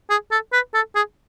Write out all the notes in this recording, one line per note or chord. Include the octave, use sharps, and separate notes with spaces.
G#4
A4
B4
A4
G#4